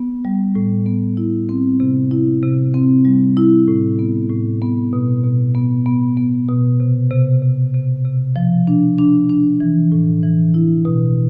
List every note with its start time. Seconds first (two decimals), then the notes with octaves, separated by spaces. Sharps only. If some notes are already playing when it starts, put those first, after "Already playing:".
Already playing: B3
0.25 G3
0.55 A2
0.86 B3
1.17 E4
1.49 C4
1.80 C3
2.11 E4
2.42 C3
2.74 C4
3.05 G3
3.37 E4
3.67 A2
3.99 B3
4.29 A2
4.62 B3
4.93 B2
5.24 B2
5.55 B3
5.86 B3
6.17 B3
6.48 B2
6.80 C3
7.11 C3
7.42 C3
7.74 C3
8.05 C3
8.36 F3
8.67 D4
8.98 D4
9.30 D4
9.60 E3
9.92 A2
10.23 E3
10.54 E4
10.85 B2